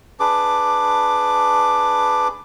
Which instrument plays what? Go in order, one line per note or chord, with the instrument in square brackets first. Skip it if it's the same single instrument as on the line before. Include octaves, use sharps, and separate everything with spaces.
[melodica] D4 G#4 B4 D6